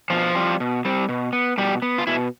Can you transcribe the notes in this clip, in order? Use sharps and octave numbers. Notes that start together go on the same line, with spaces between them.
B2 F3 F4
G3 C4
B2
G3 C4
B2
B3
B2 G3 G4
B3
F4
B2 E4